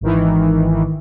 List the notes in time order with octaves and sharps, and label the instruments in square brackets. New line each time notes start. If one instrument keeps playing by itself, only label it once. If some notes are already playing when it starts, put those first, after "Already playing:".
[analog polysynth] G#1 D#3 E3